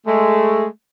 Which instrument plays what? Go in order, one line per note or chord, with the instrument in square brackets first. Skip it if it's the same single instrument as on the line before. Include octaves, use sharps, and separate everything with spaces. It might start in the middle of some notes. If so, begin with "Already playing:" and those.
[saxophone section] G#3 A3